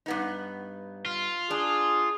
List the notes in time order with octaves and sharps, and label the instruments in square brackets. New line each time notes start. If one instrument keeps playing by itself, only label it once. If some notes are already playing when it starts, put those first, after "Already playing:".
[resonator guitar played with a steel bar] G2 B3 D#4
[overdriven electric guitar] F4
[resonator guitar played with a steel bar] D4 [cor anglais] G#4